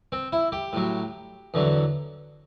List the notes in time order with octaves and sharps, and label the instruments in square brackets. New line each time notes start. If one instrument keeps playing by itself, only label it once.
[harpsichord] C4
E4
G4
A2 F#3
E2 D3 F#3